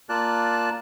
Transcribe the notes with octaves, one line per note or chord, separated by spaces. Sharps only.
A#3 F4 D5 A5 F#6